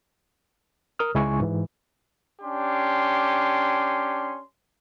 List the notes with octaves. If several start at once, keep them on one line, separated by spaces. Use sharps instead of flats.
A#4 D#6 F6
C#2 C#3 G#3 E4 G#5 C#6
G#2 E3
C#4 D4 G4 C6